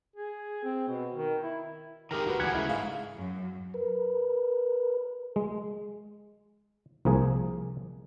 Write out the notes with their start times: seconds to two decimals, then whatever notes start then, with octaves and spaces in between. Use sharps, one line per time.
0.16 G#4
0.64 C4
0.88 B2
1.14 D#3
1.43 E4
2.11 D#3 G#3 G4 A#4 A#5
2.27 D3 F#4 B4
2.40 D2 A#2 E3 F3 G#3 F#5 B5 G#6
2.54 C#3 G#3 A3 E4
2.69 G#2 G#4 F5
3.16 F#2
3.74 A#4 B4
5.36 G#3
7.05 C2 F3 A#3 G#4